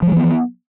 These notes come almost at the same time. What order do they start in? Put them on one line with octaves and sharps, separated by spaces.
F3 G#3 E3 B3